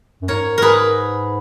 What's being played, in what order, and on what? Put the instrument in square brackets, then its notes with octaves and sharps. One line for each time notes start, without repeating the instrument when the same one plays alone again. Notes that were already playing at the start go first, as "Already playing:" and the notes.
[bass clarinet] F#2
[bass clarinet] G#2 [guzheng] A#4 C#5
[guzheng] G#4 A#4 B4